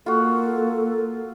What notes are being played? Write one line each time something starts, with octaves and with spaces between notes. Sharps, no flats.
A#3 F4 F#4 A4